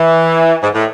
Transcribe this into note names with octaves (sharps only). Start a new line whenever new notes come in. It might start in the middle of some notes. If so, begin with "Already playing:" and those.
Already playing: E3
G#2
A2